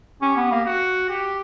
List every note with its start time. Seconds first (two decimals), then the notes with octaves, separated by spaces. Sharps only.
0.22 C#4 G4
0.37 B3
0.51 A#3
0.66 F#4
1.09 G4